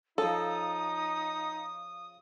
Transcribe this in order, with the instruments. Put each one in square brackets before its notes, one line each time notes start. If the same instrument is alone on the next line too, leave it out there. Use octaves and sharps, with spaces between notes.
[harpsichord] C#3 F3 [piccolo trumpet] D#4 [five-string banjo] A4 [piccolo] D#6